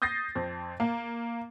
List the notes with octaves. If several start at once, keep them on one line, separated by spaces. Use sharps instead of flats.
D#6 G6 A6 A#6 C7
F2 C4
A#3